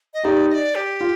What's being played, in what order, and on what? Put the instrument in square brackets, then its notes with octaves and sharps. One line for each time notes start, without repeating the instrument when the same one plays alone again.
[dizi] D#5
[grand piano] D#4 G4 [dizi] D5
[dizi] D#5
D5
G4
[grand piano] F4